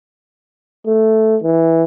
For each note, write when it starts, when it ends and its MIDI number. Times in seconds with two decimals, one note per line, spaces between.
0.87 1.38 57
1.43 1.84 52